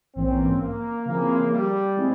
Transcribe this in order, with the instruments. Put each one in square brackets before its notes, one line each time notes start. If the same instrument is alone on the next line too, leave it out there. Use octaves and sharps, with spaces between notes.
[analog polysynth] A#1 G#2 E3 A#3 C#4 [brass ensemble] C4
[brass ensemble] A#3
[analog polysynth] C#3 F3 C4 E4 G#4 [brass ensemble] A#3
[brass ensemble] G3
[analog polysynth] A#2 G#3 C4 E4 G#4